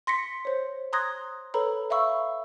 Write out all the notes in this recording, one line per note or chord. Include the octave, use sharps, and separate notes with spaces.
C6 A#6 B6 C#7
C5 C#5
A#5 C6 D#6 F#6 G#6 A#6
A4 B4 C#5 A#5 B5
E5 F5 B5 C#6 E6